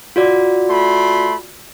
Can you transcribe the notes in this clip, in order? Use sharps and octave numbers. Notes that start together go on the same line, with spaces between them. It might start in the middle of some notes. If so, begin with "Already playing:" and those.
F4 F#4 D5
A3 B5 C6